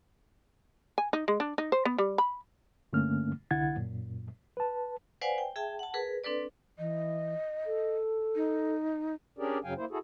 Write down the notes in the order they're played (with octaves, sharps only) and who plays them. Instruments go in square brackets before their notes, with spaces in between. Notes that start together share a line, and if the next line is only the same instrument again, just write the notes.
[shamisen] G#5
D#4
G#3
D4
D#4
C5
B3
G3
B5
[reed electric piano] G2 D3 A3 A#3 C#4 F6
C2 D3 E4 F#5 G#6 A6
F#2 A#2
B4 A5
[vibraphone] B4 C5 D5 F5 F#5 G#5
G5
G#4 E5 G5 A5
F#5 A5
G#4 A#4 B4
C4 D4 A4 B4 D5
[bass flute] E3 [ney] D#5
[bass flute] A4
[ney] D#4
[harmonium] C#4 D4 G4 G#4 A#4 D5
F#2 C#3 F#3 F5 G5 G#5
A#3 E4 C5
E4 F#4 G#4 A4